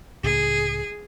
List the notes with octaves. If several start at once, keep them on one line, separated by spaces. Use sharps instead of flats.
C#2 A2 C#3 G#4